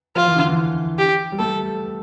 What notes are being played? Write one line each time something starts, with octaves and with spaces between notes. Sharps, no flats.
F3 F4
E3
D3
E3
G4
G3
A3 A4